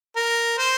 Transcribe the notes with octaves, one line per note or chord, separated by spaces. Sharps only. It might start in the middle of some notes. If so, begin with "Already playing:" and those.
A#4
C5